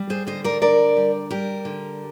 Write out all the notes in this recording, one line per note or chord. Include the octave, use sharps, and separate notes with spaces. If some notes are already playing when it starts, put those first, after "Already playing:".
Already playing: G3
G#4 C5
D3 C5 D#5
A#4 D5
D3 A#4 D5
G3
G3 G4 A#4
D3